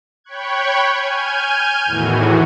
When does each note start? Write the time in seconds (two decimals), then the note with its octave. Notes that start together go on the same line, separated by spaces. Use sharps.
0.24 C#5 G5 B5 C#6 F#6 G#6
0.96 G#5 F6 G6 G#6 D#7
1.85 E2 A2 D#3 E3 F#4